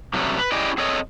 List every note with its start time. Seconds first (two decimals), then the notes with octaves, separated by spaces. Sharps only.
0.14 C3 F#3 G3 A3 B3 C#4
0.38 B4
0.52 C#4 E4 G4 G#4 D5 D#5
0.78 C4 G#4 A4 C#5 D#5